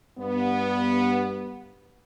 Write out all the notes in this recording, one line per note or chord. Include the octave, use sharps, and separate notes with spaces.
G2 B3